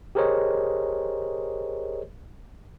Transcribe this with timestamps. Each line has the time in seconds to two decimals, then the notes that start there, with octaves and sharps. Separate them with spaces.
0.15 G4 G#4 A#4 C5 C#5 D#5